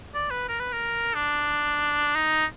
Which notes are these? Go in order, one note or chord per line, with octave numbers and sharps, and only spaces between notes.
D5
B4
A#4
B4
A#4
D4
D#4